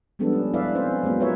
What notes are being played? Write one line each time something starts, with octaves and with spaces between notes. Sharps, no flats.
F3 G3 G#3 B3 D4 A4
C#4
E4 B4 D5 E5 F5
C4 C#4 C5
F#3 G#3 A#3 B3
F4 A#4 B4 C#5 E5